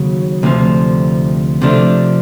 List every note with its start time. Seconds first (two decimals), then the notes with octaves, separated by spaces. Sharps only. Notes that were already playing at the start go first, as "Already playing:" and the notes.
Already playing: D#2 C#3 F#3
0.43 D2 C3 F3
1.62 C3 F3 A3 D4